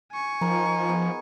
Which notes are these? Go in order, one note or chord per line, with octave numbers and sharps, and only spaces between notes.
G#5 C#6
D#3 F3 A#4
B3 G#4 A#4